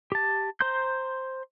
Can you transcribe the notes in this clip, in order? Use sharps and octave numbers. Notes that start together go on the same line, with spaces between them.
G4 A5
C5 A#5 C6 G6